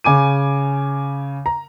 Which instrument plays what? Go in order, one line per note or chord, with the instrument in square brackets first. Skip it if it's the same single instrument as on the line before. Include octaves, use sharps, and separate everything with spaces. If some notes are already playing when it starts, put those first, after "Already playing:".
[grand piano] C#3 G#5 D6 D#7
A#5